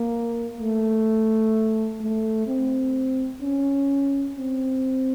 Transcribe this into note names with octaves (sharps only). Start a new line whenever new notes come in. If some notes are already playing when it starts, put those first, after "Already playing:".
Already playing: A#3
A3
A3
C4
C#4
C4